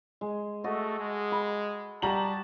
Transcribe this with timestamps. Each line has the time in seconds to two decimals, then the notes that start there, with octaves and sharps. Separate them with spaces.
0.21 G#3
0.64 A3 F#4 A4 D#5
1.00 G#3
1.32 B5
2.02 G3 F#4 G4 A5 A#5 F#7